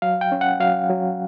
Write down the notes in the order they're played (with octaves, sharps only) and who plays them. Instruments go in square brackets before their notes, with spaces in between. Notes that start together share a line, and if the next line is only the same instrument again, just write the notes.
[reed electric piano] F#3 F5
G5
C#4
F#5
F#3 F5
F#3